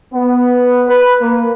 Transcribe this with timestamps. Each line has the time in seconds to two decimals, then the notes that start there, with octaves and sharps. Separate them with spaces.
0.14 B3
0.89 B4
1.22 A#3